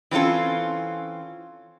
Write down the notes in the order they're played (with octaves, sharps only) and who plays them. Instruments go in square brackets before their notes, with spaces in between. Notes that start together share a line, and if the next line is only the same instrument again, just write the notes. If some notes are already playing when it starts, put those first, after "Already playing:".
[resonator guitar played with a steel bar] E3 C4 C#4 F4 A4